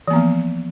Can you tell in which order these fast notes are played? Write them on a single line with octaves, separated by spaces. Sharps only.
E3 A#3 B3 F3